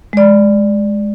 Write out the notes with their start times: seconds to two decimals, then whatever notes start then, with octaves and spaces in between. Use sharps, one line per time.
0.13 G#3 D5